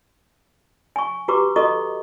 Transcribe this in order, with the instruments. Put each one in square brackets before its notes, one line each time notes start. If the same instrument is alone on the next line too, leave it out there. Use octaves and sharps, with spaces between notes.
[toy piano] G#5 C#6
F#4 G4 B4 A#5 C#6 D6
F#4 A4 D#5 A#5 C#6 D#6